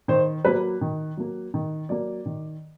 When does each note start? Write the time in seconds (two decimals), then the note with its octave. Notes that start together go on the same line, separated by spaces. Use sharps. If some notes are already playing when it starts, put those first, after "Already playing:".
0.08 D#3 C5
0.45 F#3 A#3 B4
0.81 D#3
1.17 F#3 A#3
1.54 D#3
1.89 F#3 A#3 D5
2.26 D#3